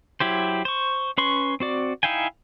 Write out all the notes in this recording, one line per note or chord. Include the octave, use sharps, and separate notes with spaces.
F#3 E4 G4 C5
C5 C#6
C#4 B4 C6 C#6
C4 F#4 D5
D#4 E4 F5 G5 G#5